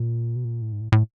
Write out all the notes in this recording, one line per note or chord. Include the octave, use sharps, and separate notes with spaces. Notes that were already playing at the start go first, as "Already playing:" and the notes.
Already playing: A#2
B2
A#2
A2
G#2
A2
A2